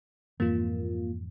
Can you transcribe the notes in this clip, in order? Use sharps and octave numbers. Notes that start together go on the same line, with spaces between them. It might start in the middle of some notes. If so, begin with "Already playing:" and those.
F2 G#2 E3 A#3 F4